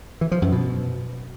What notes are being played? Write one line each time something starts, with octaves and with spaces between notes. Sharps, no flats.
E3
F3
F#2
B2